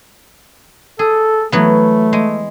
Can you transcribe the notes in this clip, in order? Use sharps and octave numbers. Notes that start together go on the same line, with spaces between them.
G#4 A4
E3 F#3 A3 B3
G#3